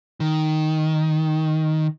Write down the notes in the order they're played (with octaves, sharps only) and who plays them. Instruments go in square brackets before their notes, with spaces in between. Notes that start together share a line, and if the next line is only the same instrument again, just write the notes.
[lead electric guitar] D#3